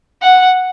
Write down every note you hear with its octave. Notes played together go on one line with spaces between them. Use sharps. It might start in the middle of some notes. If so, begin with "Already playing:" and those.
F#5